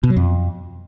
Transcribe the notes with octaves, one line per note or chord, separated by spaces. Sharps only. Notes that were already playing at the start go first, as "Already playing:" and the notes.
B2
F#3
F2